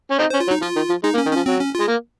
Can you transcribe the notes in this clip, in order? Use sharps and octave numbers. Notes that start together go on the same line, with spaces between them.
C#4
C4 D#4
C5
C#4
F4
F#3
D#4
F3 F4
D#3
F3
G#3 D#4
A#3
C#4
D#3
F3 C#4
F#3 C4
C#4
F4
G#3
A#3